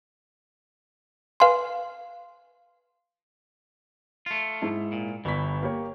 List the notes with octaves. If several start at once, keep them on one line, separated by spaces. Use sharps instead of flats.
B4 F5 G#5 C6
A3 F4
G#2 E4
A#2
G1 E3 C#6 B6
A#3 G4 C#5